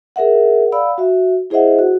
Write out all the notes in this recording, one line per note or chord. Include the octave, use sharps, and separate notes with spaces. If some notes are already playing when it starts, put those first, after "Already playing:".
G#4 A#4 E5 F#5
D5 F5 F#5 B5 E6
F#4 E5
E4 G#4 C5 D#5 E5 F#5
F#4